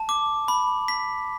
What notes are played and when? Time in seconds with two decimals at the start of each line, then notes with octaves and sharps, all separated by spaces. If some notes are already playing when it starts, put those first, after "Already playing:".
Already playing: A5
0.09 D6
0.48 B5
0.88 B6